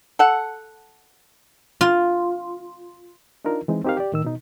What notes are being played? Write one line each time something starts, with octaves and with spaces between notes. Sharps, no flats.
A4 F#5
F4
D4 D#4 F4 A#4
E3 G#3 C4 D#4
C4 D#4 G4 A#4 F5
G4 D5
A2 D#3 E6
B2 D#4